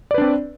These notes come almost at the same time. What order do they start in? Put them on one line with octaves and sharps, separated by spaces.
D5 B4 D4 C4